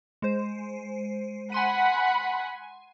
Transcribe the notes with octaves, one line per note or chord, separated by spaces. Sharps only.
G#3 C5
F#5 G#5 B5 C6 D#7